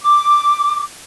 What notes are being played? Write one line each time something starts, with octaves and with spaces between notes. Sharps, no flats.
D6